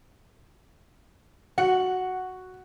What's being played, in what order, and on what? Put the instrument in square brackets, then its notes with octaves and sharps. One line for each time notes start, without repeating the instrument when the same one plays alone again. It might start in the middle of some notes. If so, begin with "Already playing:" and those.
[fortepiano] F#4 [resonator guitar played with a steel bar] F#5